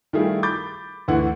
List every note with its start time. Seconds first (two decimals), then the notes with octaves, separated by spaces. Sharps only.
0.13 D#3 G3 A3 E4 F4 G#4
0.43 B5 D6 G6 A6
1.08 D2 D3 E3 F#5